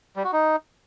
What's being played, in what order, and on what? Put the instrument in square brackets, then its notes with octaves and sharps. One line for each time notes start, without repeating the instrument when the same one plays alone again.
[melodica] G3
F#4
D#4